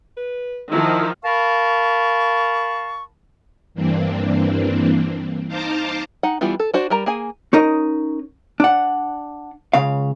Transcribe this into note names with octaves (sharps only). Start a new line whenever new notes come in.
B4
D#3 F3 E4
A#4 F5 A5 B5 C#6
G2 E3 A#3 C4 D4
D#4 C5 F5 A5 A#5 D6
D#4 F#5
E3 G3 B3 E4 F4
A4
D4 F#4 C5
G3 A#4 A#5
A#3 G#4 G#5
C#4 D#4 A#4 D#5
D4 F#5
C#2 C#3 F5